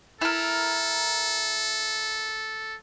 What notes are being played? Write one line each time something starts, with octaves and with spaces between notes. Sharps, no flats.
E4 A4 A#4